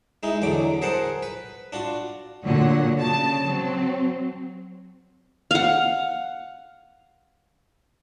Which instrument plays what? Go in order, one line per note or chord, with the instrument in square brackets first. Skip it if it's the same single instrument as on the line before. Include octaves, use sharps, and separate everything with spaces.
[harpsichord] G#3 D#4 E4
E2 D3 F#3 D6
G#4 A#4 C5 F#5 A5
B4
D4 F4 F#4
[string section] A#2 D3 F#3 F#5
C#3 A5
F#3 C4
[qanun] F5 F#5